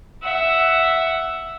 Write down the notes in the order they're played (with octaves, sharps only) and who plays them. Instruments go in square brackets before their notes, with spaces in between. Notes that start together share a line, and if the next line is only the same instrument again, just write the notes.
[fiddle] E5 F#5